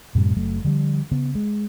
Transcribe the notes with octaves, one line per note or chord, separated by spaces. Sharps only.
F#2 A2 C3 G3
F#1 F#3 A3
D3 F3 G3
C#3 B3
G#3